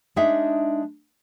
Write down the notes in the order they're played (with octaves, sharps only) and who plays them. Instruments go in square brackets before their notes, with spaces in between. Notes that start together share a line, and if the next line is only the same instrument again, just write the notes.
[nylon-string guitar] G#3 D4 D#4 E5